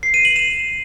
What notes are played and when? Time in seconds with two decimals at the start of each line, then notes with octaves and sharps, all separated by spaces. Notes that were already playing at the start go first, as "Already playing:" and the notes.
0.03 C7
0.14 D#7
0.25 F#7
0.36 E7